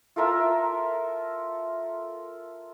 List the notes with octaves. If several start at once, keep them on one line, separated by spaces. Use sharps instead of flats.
F4 A4 A#4 E5